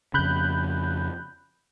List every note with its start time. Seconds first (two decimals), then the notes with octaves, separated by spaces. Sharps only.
0.14 F2 C#3 B5 F#6 G6